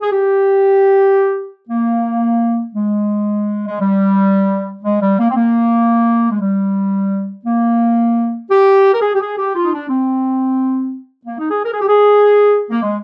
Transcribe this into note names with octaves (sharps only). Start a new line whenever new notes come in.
G#4
G4
A#3
G#3
G#3
G3
G#3
G3
A#3
C4
A#3
G#3
G3
A#3
G4
A#4
G#4
G4
G#4
G4
F4
D#4
D4
C4
A#3
D#4
G#4
A#4
G#4
G4
G#4
A#3
G#3